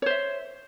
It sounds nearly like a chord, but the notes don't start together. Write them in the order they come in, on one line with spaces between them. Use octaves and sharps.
C#5 C5 E5